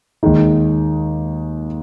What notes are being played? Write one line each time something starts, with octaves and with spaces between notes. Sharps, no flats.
D#2 D#3 G#3 D#4